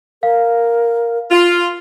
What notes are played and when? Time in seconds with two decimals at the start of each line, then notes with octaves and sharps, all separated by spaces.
0.23 A#4 F5
1.31 F4